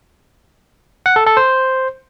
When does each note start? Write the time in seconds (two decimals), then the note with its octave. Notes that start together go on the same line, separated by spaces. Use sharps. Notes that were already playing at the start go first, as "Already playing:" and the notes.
1.06 F#5
1.16 A4
1.26 A4
1.37 C5